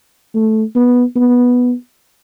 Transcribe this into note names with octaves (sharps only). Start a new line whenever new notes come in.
A3
B3
B3